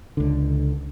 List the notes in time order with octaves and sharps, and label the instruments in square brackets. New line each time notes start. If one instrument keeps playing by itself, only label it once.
[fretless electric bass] C#2 D3